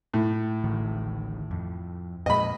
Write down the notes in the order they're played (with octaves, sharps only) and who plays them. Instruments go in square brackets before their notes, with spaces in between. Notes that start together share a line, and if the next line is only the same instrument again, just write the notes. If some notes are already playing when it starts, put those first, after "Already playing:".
[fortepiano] A2
[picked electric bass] D1 A1 D#3
F2
[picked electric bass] F2 A#2 G#3 [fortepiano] D#5 B5